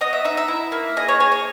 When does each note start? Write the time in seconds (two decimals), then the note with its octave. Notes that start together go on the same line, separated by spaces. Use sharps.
0.01 B3 D#5
0.13 E5
0.24 D#4 E5
0.37 E5
0.48 E4
0.72 A#3
0.97 G#4 D#5
1.08 C#5
1.20 G#4 C#5
1.32 C#5